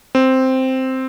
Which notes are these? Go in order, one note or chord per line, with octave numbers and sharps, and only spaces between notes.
C4